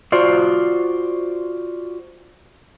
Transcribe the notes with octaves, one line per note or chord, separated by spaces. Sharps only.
F4 F#4 C5 D5